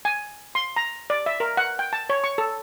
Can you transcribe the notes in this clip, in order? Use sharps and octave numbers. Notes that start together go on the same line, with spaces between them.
G#5
C6
A#5
D5
E5
A#4
F#5
G5
A5
C#5
C#6
A4